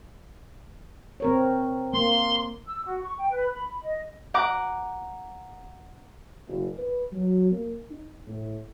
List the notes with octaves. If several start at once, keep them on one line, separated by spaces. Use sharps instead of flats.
C4 A#4 C#5
A#3 C6
E6
F#4
C#6
G5
B4
B5
D#5
F#5 A#5 D6 F#6
F#1
B4
F#3
A#3
D#4
A2